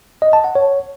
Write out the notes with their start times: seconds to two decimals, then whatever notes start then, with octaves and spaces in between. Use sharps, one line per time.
0.22 D#5
0.33 A5
0.44 F#5
0.55 C#5